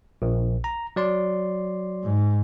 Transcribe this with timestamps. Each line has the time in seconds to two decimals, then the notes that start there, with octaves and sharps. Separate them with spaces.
0.22 A#1
0.64 A#5
0.96 F#3 D5 C6
2.04 G#2